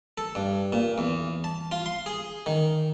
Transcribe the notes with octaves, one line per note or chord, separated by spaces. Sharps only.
A4
G2
A#2
E2
A5
F4
C6
G#4
D#3